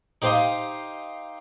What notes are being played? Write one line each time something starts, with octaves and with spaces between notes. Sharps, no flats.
D#4 G4 C5 F5 C6 D#6